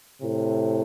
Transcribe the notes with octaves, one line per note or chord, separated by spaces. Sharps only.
A2 C3